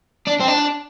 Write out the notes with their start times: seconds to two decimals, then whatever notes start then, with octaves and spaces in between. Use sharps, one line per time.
0.27 D4
0.40 C4
0.48 D4